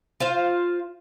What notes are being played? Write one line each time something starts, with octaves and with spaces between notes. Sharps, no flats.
F4 C5 F5